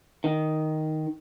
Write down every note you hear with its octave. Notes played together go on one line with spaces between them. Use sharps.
D#3